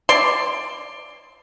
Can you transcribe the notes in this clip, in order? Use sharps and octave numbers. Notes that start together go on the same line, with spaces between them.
D5 C6